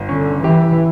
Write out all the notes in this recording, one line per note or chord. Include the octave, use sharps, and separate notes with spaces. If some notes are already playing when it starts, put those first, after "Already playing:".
Already playing: G1
D3 C#4
E3 G4